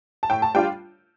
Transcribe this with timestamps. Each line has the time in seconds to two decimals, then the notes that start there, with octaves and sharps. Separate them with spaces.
0.23 A5
0.30 A2 G5
0.42 A5
0.54 G3 D4 F4 G5